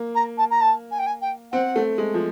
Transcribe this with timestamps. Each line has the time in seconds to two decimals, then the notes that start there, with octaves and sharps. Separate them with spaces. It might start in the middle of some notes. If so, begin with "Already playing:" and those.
Already playing: A#3
0.15 A#5
0.37 A5
0.50 A#5
0.61 A5
0.91 G#5
0.99 G5
1.06 G#5
1.21 G5
1.52 C4 F#5
1.76 A3
1.98 G#3
2.14 F3